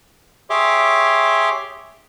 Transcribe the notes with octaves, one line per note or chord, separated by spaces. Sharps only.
G4 G#4 C#5 E5 C6 D6